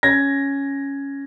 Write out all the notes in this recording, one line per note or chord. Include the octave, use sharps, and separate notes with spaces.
C#4 G#6 A#6